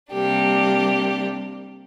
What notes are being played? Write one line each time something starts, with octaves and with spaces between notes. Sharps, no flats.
C3 G3 A#3 D4 G4